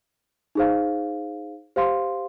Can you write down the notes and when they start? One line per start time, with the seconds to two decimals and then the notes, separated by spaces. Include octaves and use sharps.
0.55 D#4 G#4 C5 F5
1.76 G4 C5 F5 C6